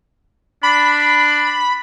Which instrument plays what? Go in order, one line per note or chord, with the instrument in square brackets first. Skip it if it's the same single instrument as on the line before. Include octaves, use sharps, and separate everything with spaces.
[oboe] D4 [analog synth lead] B5